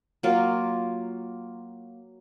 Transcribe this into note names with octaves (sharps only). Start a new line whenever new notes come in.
F#3 A#3 F4